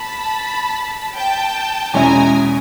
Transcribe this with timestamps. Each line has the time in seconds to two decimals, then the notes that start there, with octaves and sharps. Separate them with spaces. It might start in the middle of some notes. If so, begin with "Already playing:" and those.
Already playing: A5 B5
1.16 G5 A5
1.93 E2 B2 G#3 C#4 E4 G#5 A#5